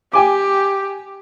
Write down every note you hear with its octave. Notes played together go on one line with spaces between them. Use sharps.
G4 G5 G#5 D6